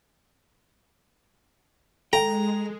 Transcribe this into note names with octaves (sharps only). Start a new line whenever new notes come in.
G#3 A4 G5 A#5